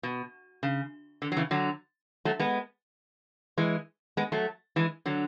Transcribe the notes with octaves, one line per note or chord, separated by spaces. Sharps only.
B2
C#3
D3
F#3
C#3 E3
D3 F#3
F#3 A3
G#3 B3
E3 G#3
G#3 B3
F#3 A3
E3 G#3
D3 F#3